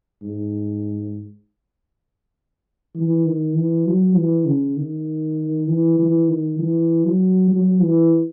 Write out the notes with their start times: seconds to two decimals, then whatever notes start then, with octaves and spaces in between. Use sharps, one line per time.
0.23 G#2
2.96 E3
3.26 D#3
3.56 E3
3.87 F#3
4.16 E3
4.47 C#3
4.77 D#3
5.68 E3
5.99 E3
6.28 D#3
6.59 E3
7.05 F#3
7.50 F#3
7.80 E3